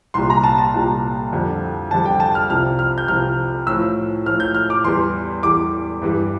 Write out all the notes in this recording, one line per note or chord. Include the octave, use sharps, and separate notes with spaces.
C2 A#2 G3 C6
A#5
A5
A5
C2 A#2 G3
F2 D3 G3
F2 D3 G3 A5
G5
A5
F6
C2 C3 F3 F6
F6
G6
C2 C3 F3 F6
A2 F3 E6
A2 F3 F6
G6
F6
D6
E2 E3 G3 C6
E2 E3 G3 D6
G2 E3 G3